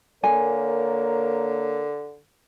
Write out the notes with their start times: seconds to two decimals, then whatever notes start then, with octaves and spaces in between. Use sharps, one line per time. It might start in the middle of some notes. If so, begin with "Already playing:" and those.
0.24 D3 A#3 A#4 C#5 G#5